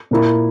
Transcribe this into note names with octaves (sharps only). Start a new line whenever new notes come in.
A#2 A#3 E4